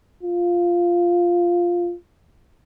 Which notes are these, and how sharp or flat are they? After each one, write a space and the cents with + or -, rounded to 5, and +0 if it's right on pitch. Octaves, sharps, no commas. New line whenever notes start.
F4 -5